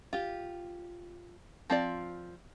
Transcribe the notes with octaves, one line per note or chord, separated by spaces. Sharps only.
F4 G4
F3 C4 F4 D5